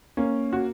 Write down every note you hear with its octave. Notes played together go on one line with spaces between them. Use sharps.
A#3 C#4
F#4